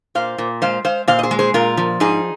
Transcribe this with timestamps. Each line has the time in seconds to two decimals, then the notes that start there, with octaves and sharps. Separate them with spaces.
0.15 A#2 C5 F5
0.38 A#2
0.62 G#3 C5 F5
0.85 G#3 C5 F5
1.08 A#2 C5 F5
1.19 D#5
1.23 G#4 C5
1.31 G#3
1.39 G#4 C5
1.54 A#2 F4 A#4
1.77 F3
2.00 G#2 D#4 G#4